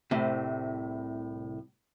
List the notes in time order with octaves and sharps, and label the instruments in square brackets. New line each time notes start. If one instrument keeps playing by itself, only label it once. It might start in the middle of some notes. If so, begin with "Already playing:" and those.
[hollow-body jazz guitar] C2 A2 C3